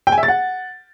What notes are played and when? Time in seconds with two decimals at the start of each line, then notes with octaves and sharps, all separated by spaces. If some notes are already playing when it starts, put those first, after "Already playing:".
0.07 G5
0.12 G#5
0.18 E5
0.23 A6
0.28 F#5